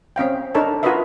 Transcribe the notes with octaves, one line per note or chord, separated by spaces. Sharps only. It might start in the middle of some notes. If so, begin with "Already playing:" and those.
C4 C#4 F5 G5
D4 D#4 A4 A#4 C#5 A5
F4 F#4 A#4 B4 D#5 E5